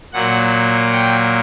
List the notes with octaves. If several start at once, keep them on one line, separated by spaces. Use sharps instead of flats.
A#2 F#3 A#3 F#5
G5